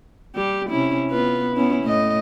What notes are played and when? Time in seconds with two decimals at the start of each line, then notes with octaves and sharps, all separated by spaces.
0.35 G3 G4
0.70 C3 C#4 E4
1.11 B3 F4 B4
1.55 B3 C#4 E4
1.84 A2 D#5